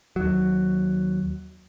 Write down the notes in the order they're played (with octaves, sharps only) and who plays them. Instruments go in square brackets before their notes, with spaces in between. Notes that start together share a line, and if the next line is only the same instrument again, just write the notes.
[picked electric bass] D#2 F#3